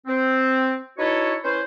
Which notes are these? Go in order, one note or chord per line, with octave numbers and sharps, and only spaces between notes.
C4
D#4 E4 F#4 A4 B4 C#5
C#4 E4 B4 C5